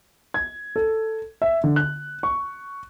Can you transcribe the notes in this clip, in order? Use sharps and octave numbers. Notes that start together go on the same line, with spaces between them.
G#6
A4
E5
D3
F#6
C#6